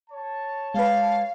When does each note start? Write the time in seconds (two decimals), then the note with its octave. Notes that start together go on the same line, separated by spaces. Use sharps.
0.10 C#5 A5
0.74 G#3 B4 F5